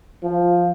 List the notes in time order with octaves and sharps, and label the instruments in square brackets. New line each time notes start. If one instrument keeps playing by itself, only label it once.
[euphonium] F3